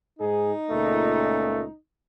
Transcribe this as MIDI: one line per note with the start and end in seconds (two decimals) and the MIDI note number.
0.19 0.51 44
0.19 1.76 63
0.19 0.51 68
0.70 1.64 37
0.70 1.64 46
0.70 1.64 57